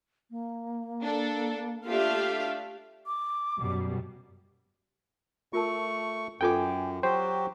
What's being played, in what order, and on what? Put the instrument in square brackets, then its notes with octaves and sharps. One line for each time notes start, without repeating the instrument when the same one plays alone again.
[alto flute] A#3
[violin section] D4 A4
[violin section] A3 D4 E5 [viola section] F4 G4 F5
[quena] D6
[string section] F#2 B2 G3
[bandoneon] A3 C#6 [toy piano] F4 A#4 A5
[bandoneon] F#2 [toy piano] F4 A4 B4 [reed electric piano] G5 G#5 D6
[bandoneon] F#3 F#4 G4 [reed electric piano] C5 G5